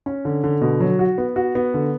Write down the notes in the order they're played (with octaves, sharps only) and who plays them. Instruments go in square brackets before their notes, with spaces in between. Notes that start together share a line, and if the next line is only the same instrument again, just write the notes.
[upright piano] C#4
D3
D3
B2
F#3
F#4
B3
F#4
B3
D3